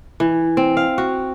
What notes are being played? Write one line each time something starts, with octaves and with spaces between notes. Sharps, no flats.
E3
C4
F5
F#4